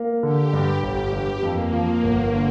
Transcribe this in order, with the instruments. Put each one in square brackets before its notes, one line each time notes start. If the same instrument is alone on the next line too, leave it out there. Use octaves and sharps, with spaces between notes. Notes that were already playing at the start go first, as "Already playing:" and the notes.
Already playing: [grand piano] A#3
[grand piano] D3 [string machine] G4
[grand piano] G2
[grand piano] G1 [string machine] G4
[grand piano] G2 [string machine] G4
[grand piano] F2 [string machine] A#3
[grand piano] F3
G1
D3